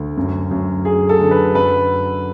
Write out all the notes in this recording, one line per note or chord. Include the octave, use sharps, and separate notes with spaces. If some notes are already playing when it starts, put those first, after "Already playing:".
Already playing: D2
F#2
F#2
D3 G#4
A4
D3
B4
F#2 B4